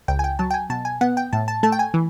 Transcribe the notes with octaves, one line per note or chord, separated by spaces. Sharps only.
C#2 G5
G#5
G5
F#3 A5
G5
G#5
B2 A5
G#5
B3 F#5
G5
A2 A5
A5
A3 A5
G5
G#5
E3